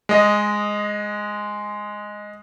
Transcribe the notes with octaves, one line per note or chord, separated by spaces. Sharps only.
G#3 D#5